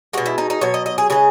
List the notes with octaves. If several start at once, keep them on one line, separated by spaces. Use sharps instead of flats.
B2 G#3 F#4
E4
D#4
D#4
B2 F#3 C#5
D#5
D#5
G#4
C#3 E3 G#3 G#4